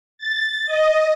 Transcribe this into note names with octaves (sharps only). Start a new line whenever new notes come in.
A6
D#5